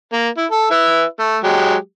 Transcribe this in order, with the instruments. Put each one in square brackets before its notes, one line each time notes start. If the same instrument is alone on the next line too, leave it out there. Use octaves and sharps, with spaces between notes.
[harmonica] A#3
E4
A4
E4 B4 E5
A3
F#3 G#3 G4